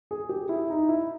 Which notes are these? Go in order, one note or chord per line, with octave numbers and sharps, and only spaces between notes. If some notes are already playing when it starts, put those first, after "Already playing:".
G#4
G4
E4
D#4
E4